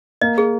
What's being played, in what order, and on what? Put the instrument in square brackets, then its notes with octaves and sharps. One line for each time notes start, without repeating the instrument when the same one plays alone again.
[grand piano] A#3 [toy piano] D#5
[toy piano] G#4